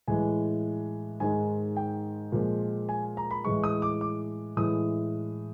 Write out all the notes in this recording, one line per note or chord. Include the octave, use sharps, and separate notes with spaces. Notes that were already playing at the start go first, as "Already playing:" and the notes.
A2 E3 G#3 G#5
G#2 D#3 G#3 G#5
G5
A#2 F3 G#3
G#5
A#5
B5
A2 E3 G#3 C#6
D#6
D6
D6
A2 E3 G#3 D#6